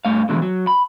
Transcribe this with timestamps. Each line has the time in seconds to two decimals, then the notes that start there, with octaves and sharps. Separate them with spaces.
0.05 G2 A3 F5
0.29 B2 D3 E3 F3 G#3
0.42 F#3
0.67 B5